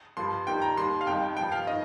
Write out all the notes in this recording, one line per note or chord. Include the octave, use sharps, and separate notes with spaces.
G2 F3 C6
G2 D#3 G3 G5
A#5
D#2 D#3 G3 C6
F5
F2 D#3 G3 G5
G2 F3 G5
F5
D#3 D#5